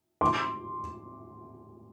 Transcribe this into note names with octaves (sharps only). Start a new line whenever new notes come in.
C6 D6